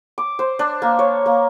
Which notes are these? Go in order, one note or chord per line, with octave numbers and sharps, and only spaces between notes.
D6
C5
D4
A#3
C#5
A#3